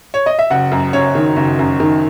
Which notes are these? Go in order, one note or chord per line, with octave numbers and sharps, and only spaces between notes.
C#5
D#5
E5
F#1 F#5
F#2
F#1 C#5
D#3
F#1
F#2
D#3